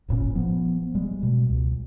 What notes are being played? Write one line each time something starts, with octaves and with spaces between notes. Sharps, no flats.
D1 G1 A#2 C#4
F3 B3
G3 G#3
B2
C#2